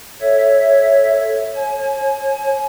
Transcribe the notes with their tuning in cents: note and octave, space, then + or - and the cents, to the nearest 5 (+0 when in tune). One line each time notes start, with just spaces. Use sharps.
A4 +0 C#5 +0 E5 +0
C#5 -35 G#5 +35